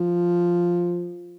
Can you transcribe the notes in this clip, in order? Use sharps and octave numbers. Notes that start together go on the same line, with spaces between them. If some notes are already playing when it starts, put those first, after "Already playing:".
Already playing: F3